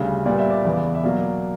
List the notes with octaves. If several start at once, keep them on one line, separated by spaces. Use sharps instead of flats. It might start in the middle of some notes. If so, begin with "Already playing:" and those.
Already playing: D2 C#3 G3
A#2 G3 B3 D5
E5
D5
E2 C#3 E3 B3
E5
B2 F#3 A#3 D5